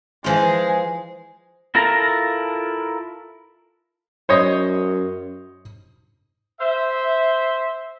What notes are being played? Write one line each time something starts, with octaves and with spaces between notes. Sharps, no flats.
E3 F3 G#3 F4 G#4
E4 F4 A4 A#4 A#5
F#2 C5 C#5 D#5
C5 E5